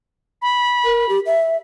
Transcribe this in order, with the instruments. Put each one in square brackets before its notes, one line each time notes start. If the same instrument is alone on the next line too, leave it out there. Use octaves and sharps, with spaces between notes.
[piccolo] B5
[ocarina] A#4
G4
E5